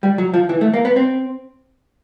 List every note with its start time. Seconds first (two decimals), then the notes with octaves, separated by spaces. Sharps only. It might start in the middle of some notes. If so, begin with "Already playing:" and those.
0.03 G3
0.18 F#3
0.34 F3
0.49 E3
0.61 A3
0.74 A#3
0.85 B3
0.96 C4